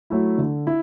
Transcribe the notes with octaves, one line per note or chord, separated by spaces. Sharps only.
F#3 A3 E4
D3
E4